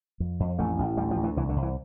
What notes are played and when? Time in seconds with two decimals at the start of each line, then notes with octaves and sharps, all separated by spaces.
0.20 F2
0.40 F2
0.59 A1 A3
0.78 A1
0.97 D2 G3
1.11 F3
1.16 D2
1.24 E3
1.37 C2 E3
1.49 D3
1.56 C2
1.63 E3